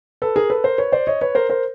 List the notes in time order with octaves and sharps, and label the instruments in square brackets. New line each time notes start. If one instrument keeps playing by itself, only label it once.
[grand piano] A4 B4
G#4 A#4
A4 B4
A#4 C5
B4 C#5
C5 D5
C#5 D#5
B4 C#5
A#4 C5
A#4 C5